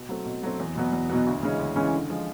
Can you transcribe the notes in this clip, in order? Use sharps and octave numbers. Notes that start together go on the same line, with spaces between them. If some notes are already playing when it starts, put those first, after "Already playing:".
Already playing: B2
F#3 A3 C4
B2
F#3 A3 C4
E2
B2 F#3 B3
E2
B2 F#3 B3
D2
C#3 E3 G#3 C#4
D2
C#3 E3 G#3 C#4
D3
F3 G#3